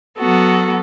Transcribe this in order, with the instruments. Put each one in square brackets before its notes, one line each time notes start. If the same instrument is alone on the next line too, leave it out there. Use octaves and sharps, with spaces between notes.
[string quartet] F#3 B3 F#4 A4